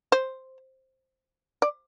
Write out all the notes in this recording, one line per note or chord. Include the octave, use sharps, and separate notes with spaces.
C5
D5